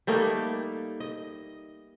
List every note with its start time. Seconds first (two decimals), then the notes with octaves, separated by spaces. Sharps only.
0.07 G3 A3 A#3 D#4
1.00 D#5